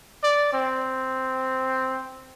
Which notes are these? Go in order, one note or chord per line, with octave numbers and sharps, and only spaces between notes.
D5
C4